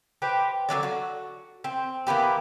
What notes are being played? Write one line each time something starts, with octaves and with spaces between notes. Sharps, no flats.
G4 B4 C5
D3 F#3 D4 D5
F#4
C4
E3 A#3 B3 G4